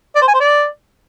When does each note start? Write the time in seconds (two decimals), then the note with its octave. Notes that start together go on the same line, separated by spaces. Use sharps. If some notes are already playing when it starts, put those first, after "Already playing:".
0.16 D5
0.22 C5
0.28 G#5
0.34 C5
0.40 D5